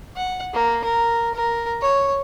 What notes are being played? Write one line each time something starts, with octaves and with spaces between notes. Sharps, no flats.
F#5
A#3
A#4
A#4
C#5